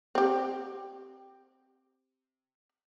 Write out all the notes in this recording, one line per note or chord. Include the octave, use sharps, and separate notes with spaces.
C4 G4